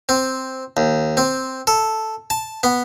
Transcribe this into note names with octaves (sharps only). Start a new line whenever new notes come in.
C4
D#2
C4
A4
A5
B3